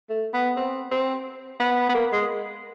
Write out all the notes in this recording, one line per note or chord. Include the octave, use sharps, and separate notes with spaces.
A3
B3
C4
C4
B3
B3
A#3
G#3